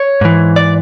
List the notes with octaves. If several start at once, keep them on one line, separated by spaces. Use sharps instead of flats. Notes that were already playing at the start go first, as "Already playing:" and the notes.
Already playing: C#5
G#2 E3
D5